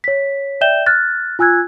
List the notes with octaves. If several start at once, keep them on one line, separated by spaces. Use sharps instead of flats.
C#5 B6
D5 E5 G5 G6 E7 G7
F6 F#6 A6
F4 G#5 E6 F#6 G#6